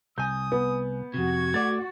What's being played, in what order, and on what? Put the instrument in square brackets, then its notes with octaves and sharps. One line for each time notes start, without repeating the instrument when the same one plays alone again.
[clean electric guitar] C2 G#5 [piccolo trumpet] D#6 [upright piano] G6
[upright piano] B3
[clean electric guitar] F2 C3 [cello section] F#4 [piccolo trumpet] G#6
[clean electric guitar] A3 D5 [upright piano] A6